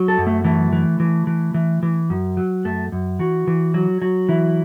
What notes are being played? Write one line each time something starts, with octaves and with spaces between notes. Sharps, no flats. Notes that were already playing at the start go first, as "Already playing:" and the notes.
Already playing: F#3
A4
F#2
A3
E3 A3
E3
E3
E3
E3
E3
F#2
F#3
F#2 A3
F#2
E3 F#4
E3
F#3
F#3
E3 E4